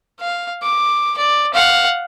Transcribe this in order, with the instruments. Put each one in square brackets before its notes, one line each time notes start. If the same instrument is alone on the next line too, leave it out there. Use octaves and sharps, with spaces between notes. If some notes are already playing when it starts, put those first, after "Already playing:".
[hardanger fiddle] F5
D6
D5
F5 F#5